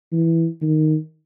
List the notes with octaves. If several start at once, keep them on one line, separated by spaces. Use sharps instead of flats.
E3
D#3